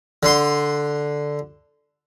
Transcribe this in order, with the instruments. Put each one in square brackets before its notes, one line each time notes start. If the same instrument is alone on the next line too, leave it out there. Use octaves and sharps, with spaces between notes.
[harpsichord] D3 C6